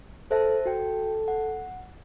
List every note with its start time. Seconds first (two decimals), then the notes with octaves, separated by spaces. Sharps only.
0.31 A4 C5 E5 A5
0.66 F#4 A4 G5
1.28 F#5